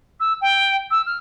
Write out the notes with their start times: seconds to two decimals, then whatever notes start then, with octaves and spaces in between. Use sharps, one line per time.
0.20 E6
0.41 G5
0.91 E6
1.06 F6